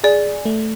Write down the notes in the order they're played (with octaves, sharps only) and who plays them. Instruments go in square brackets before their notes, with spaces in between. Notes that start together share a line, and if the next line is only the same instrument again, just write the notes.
[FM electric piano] G#4 [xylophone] D5
[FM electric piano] A3